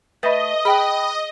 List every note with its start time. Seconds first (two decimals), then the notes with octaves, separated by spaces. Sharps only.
0.23 A3 B4 D#5 E5 B5
0.65 G#4 B4 G5 B5